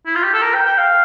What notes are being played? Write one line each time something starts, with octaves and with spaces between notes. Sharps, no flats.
E4
F4
G4
A4
A#4
G5
G5
F5